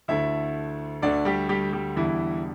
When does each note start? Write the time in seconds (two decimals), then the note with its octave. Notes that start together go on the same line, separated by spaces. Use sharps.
0.08 D2 D3 A3 E4 E5
1.02 D2 D3 A3 D4 D5
1.25 G3 G4
1.49 G3 G4
1.73 G3 G4
1.96 E1 E2 D3 E3 G3 E4